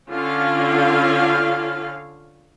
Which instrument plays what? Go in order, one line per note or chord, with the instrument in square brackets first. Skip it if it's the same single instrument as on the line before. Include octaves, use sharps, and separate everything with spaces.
[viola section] D3 C#4 F4 F5